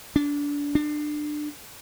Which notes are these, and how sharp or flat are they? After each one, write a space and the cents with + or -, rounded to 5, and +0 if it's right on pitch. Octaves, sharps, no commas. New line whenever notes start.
D4 -25
D4 +25